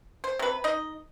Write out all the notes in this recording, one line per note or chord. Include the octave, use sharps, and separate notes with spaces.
C5
C3 B4
D#4 D#5